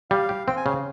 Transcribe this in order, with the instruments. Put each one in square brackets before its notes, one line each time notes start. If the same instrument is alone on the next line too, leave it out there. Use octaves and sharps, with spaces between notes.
[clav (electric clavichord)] G3 [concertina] F5
[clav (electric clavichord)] G4
[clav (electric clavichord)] C4 [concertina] G5
[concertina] G#5
[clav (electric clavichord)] C#3 [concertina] F5